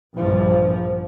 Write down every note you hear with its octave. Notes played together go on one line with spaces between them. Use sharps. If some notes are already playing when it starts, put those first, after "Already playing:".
A#1 G2 F3